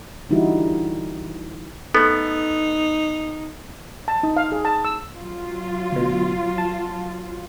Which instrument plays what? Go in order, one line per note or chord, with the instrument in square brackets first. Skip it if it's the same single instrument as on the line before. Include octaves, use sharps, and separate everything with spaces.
[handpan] D3 E3 G3 D#4 E4 F#4
[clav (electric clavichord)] A3 B3 [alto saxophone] D#4 [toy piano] A4
[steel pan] A5
D#4
F5
G#4
A5
E6
[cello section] F#3 F4
[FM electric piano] D2 B2
A5